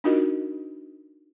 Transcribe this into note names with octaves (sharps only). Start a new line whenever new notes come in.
D4 D#4 F4 F#4 A#4 D#5